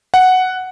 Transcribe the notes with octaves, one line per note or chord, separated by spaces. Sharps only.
F#5